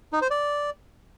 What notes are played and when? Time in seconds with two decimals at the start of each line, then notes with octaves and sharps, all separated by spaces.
0.13 D#4
0.22 C5
0.30 D5